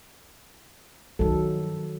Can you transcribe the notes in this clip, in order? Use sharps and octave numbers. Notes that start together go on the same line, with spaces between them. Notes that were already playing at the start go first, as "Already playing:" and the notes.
G2 D#3 F3 F#3 A4